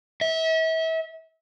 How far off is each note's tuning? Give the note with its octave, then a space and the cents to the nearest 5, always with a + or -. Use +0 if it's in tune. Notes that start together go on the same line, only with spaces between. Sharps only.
E5 -35